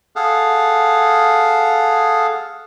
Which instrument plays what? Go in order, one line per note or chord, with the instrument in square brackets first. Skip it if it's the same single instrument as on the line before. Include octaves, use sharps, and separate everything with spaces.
[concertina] G#4 A4 F5 F#5